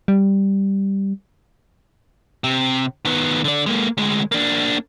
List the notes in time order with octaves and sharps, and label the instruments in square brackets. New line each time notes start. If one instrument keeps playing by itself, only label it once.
[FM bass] G3
[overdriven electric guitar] C3
D#3 B3
D3 D5
G#3 A#3
D2 G#3
A#3 D4